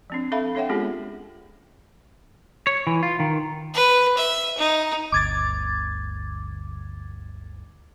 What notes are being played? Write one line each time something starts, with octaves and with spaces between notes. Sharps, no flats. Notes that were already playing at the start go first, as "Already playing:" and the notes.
F3 C4 D4
C4 A4 E5 F5 B5
D4 A4 C#5 E5 F#5 G5
G#3 B3 C#4 F4 G4 G#4
C#5
E3
F4
D#3
B4
E5
D#4
G1 D2 D6 G#6 A6